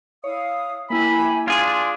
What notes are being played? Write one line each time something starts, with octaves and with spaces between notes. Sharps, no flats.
E4 C#5 F5 D#6
A#3 E4 G4 E5 G#5 B5
D4 F4 G#4 C6 G#6